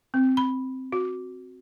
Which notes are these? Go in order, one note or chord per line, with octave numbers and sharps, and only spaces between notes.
C4
B5
F#4